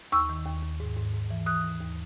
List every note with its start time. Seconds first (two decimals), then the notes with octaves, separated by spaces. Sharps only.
0.12 D#2 C#6 E6
0.29 D#3
0.46 D#2
0.63 D#2
0.80 G#2
0.96 G#2
1.13 G#2
1.30 E3
1.46 E3 D#6 F#6
1.64 D#2
1.80 D#2